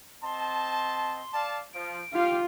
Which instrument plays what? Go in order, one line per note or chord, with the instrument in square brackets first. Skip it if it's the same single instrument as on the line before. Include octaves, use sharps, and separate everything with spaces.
[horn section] C4 D#5 A5 [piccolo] C6
[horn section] D5 F5 A5
[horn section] F3 [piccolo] D7
[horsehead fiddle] F4 [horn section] G4 F5